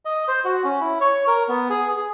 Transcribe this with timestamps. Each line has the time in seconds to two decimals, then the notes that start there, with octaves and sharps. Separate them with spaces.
0.05 D#5
0.28 C5
0.45 F#4
0.64 C#4
0.80 E4
1.01 C#5
1.27 A#4
1.48 B3
1.70 G#4
1.97 G#4